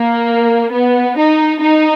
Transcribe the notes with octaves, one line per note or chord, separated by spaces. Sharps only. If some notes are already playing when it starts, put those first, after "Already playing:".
Already playing: A#3
B3
D#4
D#4